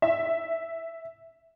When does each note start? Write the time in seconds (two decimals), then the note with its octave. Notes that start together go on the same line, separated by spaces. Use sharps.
0.02 E5